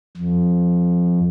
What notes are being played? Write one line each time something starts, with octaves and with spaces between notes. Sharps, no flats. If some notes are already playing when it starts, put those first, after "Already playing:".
F2